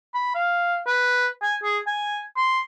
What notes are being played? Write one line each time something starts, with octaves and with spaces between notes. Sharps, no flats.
B5
F5
B4
G#5
G#4
G#5
C6